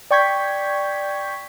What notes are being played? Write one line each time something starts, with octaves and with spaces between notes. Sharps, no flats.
D5 G5 C#6 G6 G#6 B6